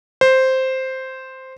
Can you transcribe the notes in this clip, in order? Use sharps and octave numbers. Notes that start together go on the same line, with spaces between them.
C5